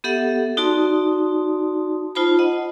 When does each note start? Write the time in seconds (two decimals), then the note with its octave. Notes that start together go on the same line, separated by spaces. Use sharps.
0.04 B3 G4 A4 E5 F#5
0.57 D#4 F#4 D5 A5 C6 D#6
2.15 D#4 F4 C5 A5 B5
2.39 D#5 F#5